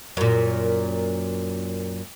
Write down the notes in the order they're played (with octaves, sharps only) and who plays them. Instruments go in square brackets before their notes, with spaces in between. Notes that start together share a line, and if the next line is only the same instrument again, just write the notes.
[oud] F#2 A#2